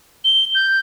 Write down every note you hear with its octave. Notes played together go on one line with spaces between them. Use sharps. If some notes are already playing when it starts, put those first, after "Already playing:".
G7
G6